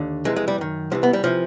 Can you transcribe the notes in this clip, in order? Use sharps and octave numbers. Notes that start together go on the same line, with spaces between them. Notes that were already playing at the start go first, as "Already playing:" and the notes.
Already playing: D#2 D3
F2 C3 E3 G#3
G#3
G3
F#2 D#3
C2 C3 E3 F3
B3
G3
C3 E3 F3